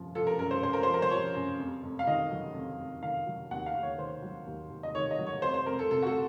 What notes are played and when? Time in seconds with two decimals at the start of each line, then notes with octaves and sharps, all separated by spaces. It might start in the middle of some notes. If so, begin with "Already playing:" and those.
Already playing: F#2 F3
0.15 F3 A4
0.27 A#4
0.39 F#2 A#4
0.51 C5
0.62 F#2 C5
0.73 A#4
0.83 F3 C5
0.94 A#4
1.02 C5
1.10 F3 C#5
1.34 F#2
1.59 F2
1.83 F2
1.99 F5
2.07 D#3 D#5
2.30 F#3
2.54 F2
2.79 F2
3.02 D#3 F5
3.26 F#3
3.51 D#2 F#5
3.66 F5
3.74 D#2
3.83 C#5
3.98 D#3 C5
4.22 F#3
4.47 D#2
4.70 D#2
4.83 D#5
4.95 D#3 C#5
5.11 D#5
5.18 F#3
5.26 C#5
5.42 F2 C5
5.54 C5
5.66 F2 A#4
5.79 A4
5.90 C3 A4
6.03 F#4
6.07 A4